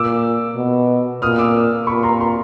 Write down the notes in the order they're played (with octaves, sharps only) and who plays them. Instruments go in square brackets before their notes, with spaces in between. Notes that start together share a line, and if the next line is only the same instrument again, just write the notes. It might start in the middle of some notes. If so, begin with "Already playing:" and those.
Already playing: [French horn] A#2 [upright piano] D6 E6
[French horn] B2
[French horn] A#2 [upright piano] D#6 F6
[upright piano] D6 E6
[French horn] A#2 [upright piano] B5 C#6
[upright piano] A#5 C6
A#5 C6